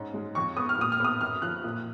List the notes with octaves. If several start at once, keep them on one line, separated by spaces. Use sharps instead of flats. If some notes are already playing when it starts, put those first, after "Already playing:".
Already playing: G#2 C#4
G#3
F2 C#6
B3 D#6
F6
A#2 D#6
F6
B3 D#6
F#2 F6
F3 F#6
A#2